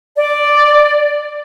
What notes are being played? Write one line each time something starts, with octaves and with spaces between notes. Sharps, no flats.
D5